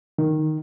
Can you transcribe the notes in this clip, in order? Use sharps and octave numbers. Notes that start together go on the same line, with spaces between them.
D#3